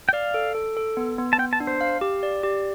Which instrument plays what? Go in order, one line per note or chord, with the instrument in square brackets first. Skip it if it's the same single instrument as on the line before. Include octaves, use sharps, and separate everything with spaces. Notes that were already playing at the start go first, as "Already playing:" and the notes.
[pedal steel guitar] G5
[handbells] D5 [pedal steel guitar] F5
[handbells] A4
A4
A4
B3
B3
[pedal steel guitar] A5
[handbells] B3 [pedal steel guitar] G5
[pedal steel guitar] A5
[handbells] D4
[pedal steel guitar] C5
[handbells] F5
G4
D5
G4